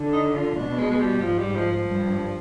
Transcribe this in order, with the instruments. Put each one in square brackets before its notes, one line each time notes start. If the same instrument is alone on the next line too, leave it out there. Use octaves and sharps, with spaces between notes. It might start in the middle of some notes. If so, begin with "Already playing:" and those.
Already playing: [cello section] D3
[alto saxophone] D#4
F4
[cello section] B2 [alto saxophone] D4
[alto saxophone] G#3
G#3
G3
[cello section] G#2 [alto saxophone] F3
[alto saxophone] G3
F3
F3
[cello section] G2